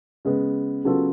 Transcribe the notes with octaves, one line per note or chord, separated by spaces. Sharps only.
C#3 G#3 B3
C#3 F#3 B3 F4 A4